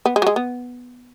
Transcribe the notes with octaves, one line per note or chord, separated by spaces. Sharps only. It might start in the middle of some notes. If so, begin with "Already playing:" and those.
B3
G#3
F#3
G#3
B3